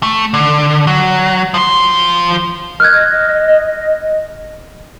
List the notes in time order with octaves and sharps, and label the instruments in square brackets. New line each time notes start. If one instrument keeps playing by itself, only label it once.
[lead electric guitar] A3
D3
F#3
F3 C6
[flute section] D#5 [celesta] F6 F#6 G#6